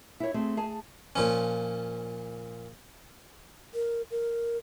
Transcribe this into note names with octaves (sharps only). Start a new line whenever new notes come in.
E4 C#5
A3 C4 G#4
G#4 A5
A#2 F3 C#4
A#4
A#4